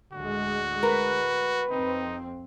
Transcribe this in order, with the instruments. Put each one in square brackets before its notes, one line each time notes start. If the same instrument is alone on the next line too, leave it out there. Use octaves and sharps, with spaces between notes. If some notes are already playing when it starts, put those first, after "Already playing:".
[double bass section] D2 A2 G#3 [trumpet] F#4
[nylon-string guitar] A#4 [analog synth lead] B4
[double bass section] F2 C4 [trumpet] D#4